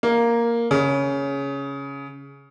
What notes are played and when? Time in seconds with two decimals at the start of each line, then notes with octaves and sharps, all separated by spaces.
0.03 A#3
0.71 C#3